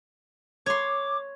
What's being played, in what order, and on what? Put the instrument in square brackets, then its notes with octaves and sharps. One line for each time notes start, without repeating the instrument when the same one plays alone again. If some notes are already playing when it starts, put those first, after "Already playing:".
[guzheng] C#5 C6 [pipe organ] D6